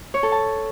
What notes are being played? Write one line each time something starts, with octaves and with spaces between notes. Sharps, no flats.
C#5
A4
A5